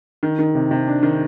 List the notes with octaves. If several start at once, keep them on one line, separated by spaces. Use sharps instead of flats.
D#3
D#3
C3
C3
D4
D#3